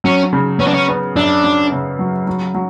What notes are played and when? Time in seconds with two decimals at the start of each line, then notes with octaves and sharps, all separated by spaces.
0.04 F#3 C#4
0.33 C#3
0.60 B3 C#4
0.68 D4
0.74 C#4
0.89 B3
1.16 F#2 D4
1.44 F#2
1.72 C#3
1.99 F#3
2.27 F#3
2.55 F#3